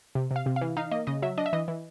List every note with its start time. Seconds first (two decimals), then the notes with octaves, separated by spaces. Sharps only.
0.15 C3
0.31 C3
0.36 F5
0.46 C3
0.56 F5
0.61 E3
0.77 D#4 F5
0.91 A#3 D#5
1.07 C#3 D#5
1.22 F#3 E5
1.38 D4 D#5
1.46 E5
1.53 E3 D#5
1.68 E3